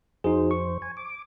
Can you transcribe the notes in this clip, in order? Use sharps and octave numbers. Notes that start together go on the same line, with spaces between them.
F2 D#4 F#4 G#4 C5
C#6
G#5
D6